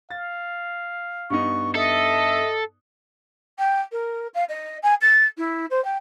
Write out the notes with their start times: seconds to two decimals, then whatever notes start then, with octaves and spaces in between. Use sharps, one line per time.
0.10 F5 A6
1.30 G2 B3 D#4 C#6
1.75 A4 D#5 E5
3.58 G5
3.92 A#4
4.34 F5
4.49 D#5
4.82 G#5
5.01 A6
5.37 E4
5.70 C5
5.84 G5